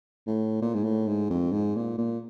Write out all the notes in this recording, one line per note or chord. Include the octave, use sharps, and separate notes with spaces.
A2
A#2
G#2
A2
G#2
F2
G#2
A#2
A#2